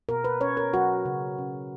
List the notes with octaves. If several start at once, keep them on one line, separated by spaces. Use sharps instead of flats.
B2 A#4
B4
C#4 C#5
A#4
F#3 F#4
C#3
C#3